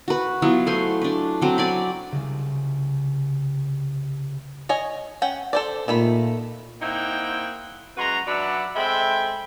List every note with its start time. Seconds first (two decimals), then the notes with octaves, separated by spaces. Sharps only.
0.08 F#4 B4
0.42 F#3 B3 E4 F4
0.67 A3 C5 G#5 C6
1.02 D4 B4
1.42 F#3 C4
1.58 D5 G#5 B5
2.12 C2 C#3
4.69 C#5 D#5 G#5
5.22 C#4 F#5 G5
5.53 A4 C5 D5
5.88 A#2 D#3 A3 B5
6.82 A#3 C4 D#4 E4 F#5 G5
7.97 F#2 G#3 F#4 B4 A#5 C6
8.27 F#3 D4 B4 D5 E5 F#5
8.76 G#3 C4 A4 E5 G5 B5